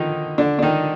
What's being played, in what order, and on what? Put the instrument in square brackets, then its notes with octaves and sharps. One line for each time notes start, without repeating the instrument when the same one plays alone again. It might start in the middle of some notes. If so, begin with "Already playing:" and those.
Already playing: [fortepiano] D3 D#3 F3 D#4
D3 D4
D4
D#3 D#4